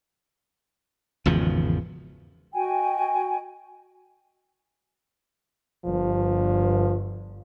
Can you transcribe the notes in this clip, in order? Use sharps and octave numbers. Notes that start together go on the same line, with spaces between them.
G#1 E2 C#3 F3
F#4 D#5 G5 G#5
G1 G2 F3